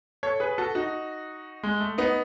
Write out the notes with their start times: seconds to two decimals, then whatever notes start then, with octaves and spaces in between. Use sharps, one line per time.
0.23 A4 C#5
0.40 G#4 B4
0.58 F#4 A4
0.75 D#4 F#4
1.63 G#3
1.80 A3
1.98 B3 D#4